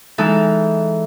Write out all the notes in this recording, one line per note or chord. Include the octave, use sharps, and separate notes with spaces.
E3 G#3 D#4 A4